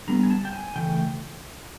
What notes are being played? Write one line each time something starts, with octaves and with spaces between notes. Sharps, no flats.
D3 G3 B3 A#5
G#5
A5
G5
G#5
C#3 E3 A3 G5